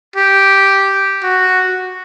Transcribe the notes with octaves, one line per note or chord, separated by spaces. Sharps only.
G4
F#4